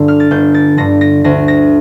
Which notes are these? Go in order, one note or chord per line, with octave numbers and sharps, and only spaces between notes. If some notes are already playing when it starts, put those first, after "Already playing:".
Already playing: G1 G2 D3
F6
A6
G1 G6
A6
G2 D3 A#6
A#6
D2 A#6
A#6